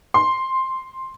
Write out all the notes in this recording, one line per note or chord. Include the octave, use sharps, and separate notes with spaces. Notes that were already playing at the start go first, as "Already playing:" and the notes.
C6